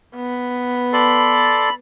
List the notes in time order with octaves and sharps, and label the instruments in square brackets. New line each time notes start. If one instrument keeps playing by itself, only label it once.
[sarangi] B3
[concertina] A4 D5 C6 [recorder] B5